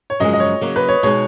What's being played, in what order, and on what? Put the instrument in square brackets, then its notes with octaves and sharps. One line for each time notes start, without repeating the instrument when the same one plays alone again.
[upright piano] C#5
[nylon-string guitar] F#2 C#3 F3 G#3 [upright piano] D#5
[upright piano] D#5
C#5
[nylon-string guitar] C#3 F#3 A#3
[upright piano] B4
C#5
[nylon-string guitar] B2 G#3 D#4 [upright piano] C#5